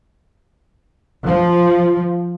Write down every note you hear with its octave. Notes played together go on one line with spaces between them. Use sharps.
F3